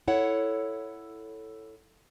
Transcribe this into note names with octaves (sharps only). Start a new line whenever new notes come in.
E4 A4 C#5 F#5